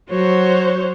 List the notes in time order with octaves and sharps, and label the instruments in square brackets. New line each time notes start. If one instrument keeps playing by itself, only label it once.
[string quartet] F#3 F#4 C5 C#5